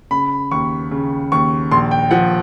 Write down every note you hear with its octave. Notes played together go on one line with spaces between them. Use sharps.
C#3 B5
D#2 C#6
C#3
D#2 C#6
A#1 C6
G5
F3 F#5